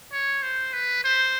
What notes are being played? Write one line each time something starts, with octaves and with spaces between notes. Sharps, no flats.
C#5
C5
B4
C5